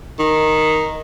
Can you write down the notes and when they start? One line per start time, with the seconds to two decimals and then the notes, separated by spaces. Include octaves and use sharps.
0.19 D#3